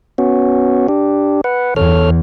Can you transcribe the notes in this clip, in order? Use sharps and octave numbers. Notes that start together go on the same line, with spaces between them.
B3 C#4 F#4
D4 G4
B4 F#5
E2 A4 C#5 F6